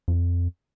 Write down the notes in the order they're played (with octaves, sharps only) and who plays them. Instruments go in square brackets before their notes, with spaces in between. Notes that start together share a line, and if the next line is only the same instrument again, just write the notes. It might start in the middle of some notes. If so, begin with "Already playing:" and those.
[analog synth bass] F2